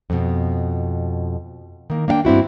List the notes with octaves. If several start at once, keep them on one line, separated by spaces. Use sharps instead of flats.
F2 B2
D#3 A#3
A#3 D4 F5 G5
G2 C4 E4 F#4